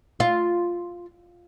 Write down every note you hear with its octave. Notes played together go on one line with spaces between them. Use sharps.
F4